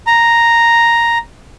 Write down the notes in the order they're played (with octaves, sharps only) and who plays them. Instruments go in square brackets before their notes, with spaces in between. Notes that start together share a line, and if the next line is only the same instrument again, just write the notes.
[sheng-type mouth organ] A#5